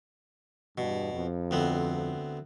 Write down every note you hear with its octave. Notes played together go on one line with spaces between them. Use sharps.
E2 G2 B2
F2
D2 B3 C4